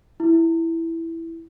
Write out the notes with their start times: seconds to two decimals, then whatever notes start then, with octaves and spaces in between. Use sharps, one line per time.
0.20 E4